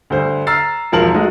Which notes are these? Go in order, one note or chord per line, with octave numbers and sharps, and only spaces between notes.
D2 G2 C5
A#5 E6 F6 A6 C7
E1 G#2 F3 A#4 A5 F#7
G#3 A3 D#4 F#4